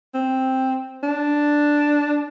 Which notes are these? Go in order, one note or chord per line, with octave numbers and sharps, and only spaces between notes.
C4
D4